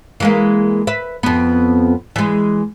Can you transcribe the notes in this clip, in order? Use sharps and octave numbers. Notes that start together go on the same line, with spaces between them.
E3 G#3 A#3
B4 E5
F2 B3
E3 G#3